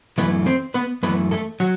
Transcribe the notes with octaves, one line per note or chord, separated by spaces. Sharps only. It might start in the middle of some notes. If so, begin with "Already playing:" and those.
F#2 E3 A3 B3 B4
C4 C5
B3 B4
F#2 E3 A3 B3 B4
A3 A4
F#3 F#4